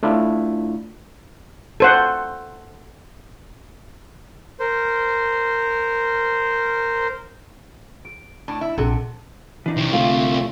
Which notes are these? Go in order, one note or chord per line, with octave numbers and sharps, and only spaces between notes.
A3 D4 E4 F4
A4 C5 F#5
A#4 C5
D7
A2 D4
E4
A#1 C3 A4 F#5
E3 D4 D#4
C2 C3
D3 A3 F4